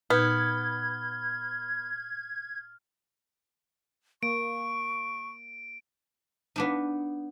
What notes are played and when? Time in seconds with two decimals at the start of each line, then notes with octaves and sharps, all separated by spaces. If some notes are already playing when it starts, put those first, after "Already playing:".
0.10 A#2 B3 D#4 F6 G6 G#6
4.23 A#3 C#6 D7
6.56 B3 D4 D#4